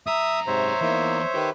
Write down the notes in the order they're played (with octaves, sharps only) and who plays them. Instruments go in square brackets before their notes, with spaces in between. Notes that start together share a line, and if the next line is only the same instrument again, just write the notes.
[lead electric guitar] F#2 A#5 [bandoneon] E5 D#6
[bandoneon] G#2 C3 [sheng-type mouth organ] C5 C#5 E5
[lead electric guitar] E2 [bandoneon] A#3 D#4 E4
[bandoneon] D#3 B4 [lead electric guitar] G4